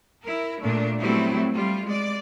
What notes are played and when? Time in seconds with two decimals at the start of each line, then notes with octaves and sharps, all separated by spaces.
0.22 E4 A#4
0.61 A#2 A3 D4
0.98 F#3 G3 A3 B3 C4 E4
1.54 G3 F4
1.85 G#3 D5